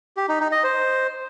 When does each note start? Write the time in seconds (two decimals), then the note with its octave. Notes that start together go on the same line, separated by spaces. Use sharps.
0.17 G4
0.29 D#4
0.40 D#4
0.52 D#5
0.63 C5